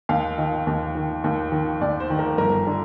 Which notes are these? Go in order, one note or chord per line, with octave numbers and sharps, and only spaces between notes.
D#2 F5
D#3 D#5
D#2
D#3
D#2
D#3
D#2 D5
C5
D#3
A#4
G1 A#4
D3